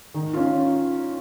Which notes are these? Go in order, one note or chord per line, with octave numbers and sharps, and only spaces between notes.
D#3
C#4 F4